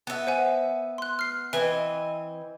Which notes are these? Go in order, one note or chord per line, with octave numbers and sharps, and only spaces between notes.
B3 E5
C5 F#5 G#5
C6 F#6
F6 C7
E3 C4 B4 D#5 E5